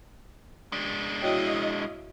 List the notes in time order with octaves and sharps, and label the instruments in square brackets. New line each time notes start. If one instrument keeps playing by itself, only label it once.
[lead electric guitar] G#3 D4
[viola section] E4 D#5 F5 [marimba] F#4 C#5 G5